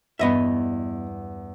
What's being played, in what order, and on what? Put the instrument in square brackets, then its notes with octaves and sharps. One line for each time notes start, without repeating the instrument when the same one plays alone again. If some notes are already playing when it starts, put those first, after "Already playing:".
[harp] E2 G2 [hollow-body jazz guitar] B3 D#5 E5